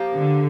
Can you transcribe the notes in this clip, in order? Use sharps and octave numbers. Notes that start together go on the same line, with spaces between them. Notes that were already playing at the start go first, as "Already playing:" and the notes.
Already playing: F3 A#3 G4
D3